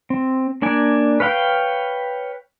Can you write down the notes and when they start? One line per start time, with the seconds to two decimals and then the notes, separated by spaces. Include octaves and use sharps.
0.10 C4
0.62 A#3 D4 D5 G#5
1.20 B4 C#5 F5 G5